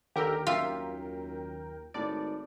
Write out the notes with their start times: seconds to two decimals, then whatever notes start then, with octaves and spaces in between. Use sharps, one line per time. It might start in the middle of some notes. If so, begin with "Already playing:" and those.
0.16 D#2 D3 G4 A#4 G5 E6
0.47 F#2 F4 G4 E5 F5
1.94 G#1 A2 D5